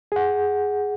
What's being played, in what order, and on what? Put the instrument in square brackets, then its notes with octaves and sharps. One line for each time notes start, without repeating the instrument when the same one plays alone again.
[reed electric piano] G#4 F#5